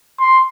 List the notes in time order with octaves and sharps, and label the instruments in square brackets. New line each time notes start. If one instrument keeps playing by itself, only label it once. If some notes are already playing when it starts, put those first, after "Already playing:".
[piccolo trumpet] C6